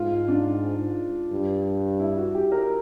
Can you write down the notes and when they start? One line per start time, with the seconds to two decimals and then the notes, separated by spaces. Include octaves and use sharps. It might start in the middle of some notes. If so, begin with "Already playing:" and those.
Already playing: G#2 F4
0.28 D4
1.32 G2
1.99 E4
2.17 F#4
2.35 G4
2.52 A#4